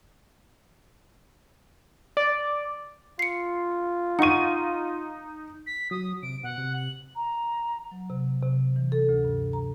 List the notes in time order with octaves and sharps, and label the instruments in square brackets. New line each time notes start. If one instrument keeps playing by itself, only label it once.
[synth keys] D5
[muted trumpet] F4 [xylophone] C7 C#7
[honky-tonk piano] D#4 D#7 [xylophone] F#5 C#6
[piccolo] B6
[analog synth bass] F#3 [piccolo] D#6
[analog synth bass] C3 [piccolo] D7
[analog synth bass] B2 [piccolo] F#5
[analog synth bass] C3
[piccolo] F#7
A#5
[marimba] F#3
C3
C3
E3
A4
D2
G2
A#5